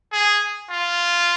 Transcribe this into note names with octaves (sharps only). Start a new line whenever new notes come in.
G#4
F4